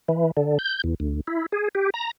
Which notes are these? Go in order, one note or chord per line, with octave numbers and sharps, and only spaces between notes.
E3
D3
G6
E2
D2
E4
G#4
G4
A#5